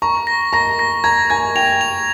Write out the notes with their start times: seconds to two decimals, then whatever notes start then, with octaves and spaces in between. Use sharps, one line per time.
0.02 A#5 C#6
0.27 A#6
0.53 A#5 A#6
0.79 A#6
1.04 A#5 G#6
1.30 G#5 G#6
1.56 G5 F7
1.81 F7